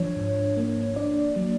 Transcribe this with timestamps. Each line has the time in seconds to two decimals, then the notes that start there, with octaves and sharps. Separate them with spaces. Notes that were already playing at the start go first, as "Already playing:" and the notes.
Already playing: F3 D4 C#5
0.17 G#2
0.57 A#3
0.96 D4 D5
1.36 F#3